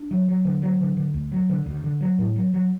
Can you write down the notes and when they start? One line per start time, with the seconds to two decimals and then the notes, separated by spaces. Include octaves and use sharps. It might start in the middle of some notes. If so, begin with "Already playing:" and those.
Already playing: D4
0.11 F#3
0.28 F#3
0.45 D3
0.62 F#3
0.80 D3
0.97 D3
1.14 D2
1.32 F#3
1.49 D3
1.66 D2
1.84 D3
2.01 F#3
2.18 A2
2.36 F#3
2.54 F#3